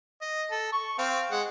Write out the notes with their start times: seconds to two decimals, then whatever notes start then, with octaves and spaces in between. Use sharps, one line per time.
0.21 D#5
0.51 A4
0.73 C#6
0.98 C4 F5
1.31 G#3 F#5